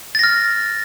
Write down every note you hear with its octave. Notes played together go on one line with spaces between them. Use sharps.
F6 A6 A#6